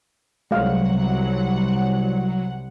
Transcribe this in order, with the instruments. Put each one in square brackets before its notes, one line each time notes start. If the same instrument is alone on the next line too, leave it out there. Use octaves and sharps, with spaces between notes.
[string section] C2 F#5 [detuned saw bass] F#3 [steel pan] G#3 F5